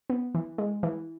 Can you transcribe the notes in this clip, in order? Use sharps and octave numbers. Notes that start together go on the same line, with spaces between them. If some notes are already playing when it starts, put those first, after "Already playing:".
B3
E3
G#3
E3